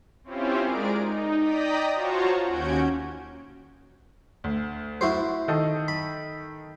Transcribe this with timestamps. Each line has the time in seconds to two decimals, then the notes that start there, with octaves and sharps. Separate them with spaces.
0.24 C4 C#4 E4 F4 G4 C5
0.63 G#3 G#4 A#4 D5 D7
0.99 D#4
1.40 D5 D#5 G5 A#5 D#6 B6
1.93 F4 F#4 C5 C#5 A5 A#5
2.43 D#2 C#4 F#4 G6 G#6 D7
4.44 D2
5.01 E4 F#4 C5
5.48 D#3 A4 D#5
5.88 B5